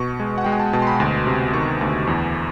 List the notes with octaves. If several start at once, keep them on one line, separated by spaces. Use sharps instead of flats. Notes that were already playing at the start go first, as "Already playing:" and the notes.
Already playing: B2 C#6
G#3
F#5
G#3 G5
G#5
A5
B2 A5
C6
B5
D2 C6
C3
D#3 C#6
D2
E2